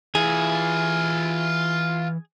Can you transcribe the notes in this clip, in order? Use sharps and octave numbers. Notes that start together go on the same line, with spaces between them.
E3 F4 G#4 E5